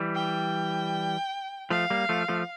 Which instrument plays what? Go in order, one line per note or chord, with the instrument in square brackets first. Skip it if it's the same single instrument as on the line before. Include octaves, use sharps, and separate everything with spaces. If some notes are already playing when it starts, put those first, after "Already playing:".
Already playing: [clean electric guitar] E3 G3
[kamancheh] G5
[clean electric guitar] F3 A3 [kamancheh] F5
[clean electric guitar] G3 A#3
F3 A3
F3 A3